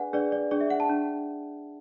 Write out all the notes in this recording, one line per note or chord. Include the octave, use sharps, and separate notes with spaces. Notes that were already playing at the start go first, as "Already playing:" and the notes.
Already playing: D4 G#4 B4 D5 F#5 G#5
D4 G#4 B4 D5
D5
D4 G#4 D5
E5
F#5
A5
D4